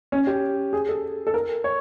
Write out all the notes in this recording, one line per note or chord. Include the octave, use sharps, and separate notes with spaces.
C#4
G4
G#4
A4
A4
A#4
C#5